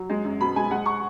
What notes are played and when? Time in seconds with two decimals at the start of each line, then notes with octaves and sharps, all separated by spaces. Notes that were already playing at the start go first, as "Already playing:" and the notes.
Already playing: F#3
0.10 G#3
0.24 F#2
0.41 B2 B5
0.56 G#3 G#5
0.71 G#3 F#5
0.86 C#6